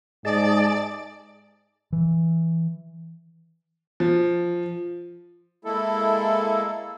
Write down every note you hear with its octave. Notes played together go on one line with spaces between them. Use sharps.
G#2 G#4 D5 D#5 A5
E3
F3
G#3 A#3 E4 A4